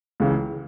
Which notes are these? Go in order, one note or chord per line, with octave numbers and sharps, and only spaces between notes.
C#2 C#3 E3